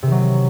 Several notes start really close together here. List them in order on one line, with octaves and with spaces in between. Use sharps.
C3 D#3 F#3